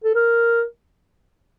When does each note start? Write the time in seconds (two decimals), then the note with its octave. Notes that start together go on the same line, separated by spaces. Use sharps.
0.04 A4
0.15 A#4